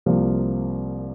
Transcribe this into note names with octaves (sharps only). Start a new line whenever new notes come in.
C2 C3 F3 A#3